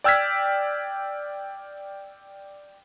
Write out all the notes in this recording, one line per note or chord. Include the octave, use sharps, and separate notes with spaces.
D5 G5 E6 F6 G#6 B6